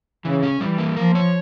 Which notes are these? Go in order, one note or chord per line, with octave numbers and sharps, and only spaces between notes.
C#3 E3
C#4
E3 G3
A#3
F3 A#4
C#5